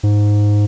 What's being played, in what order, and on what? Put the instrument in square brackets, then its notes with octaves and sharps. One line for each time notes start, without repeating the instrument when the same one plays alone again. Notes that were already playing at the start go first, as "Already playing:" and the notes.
[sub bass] G#2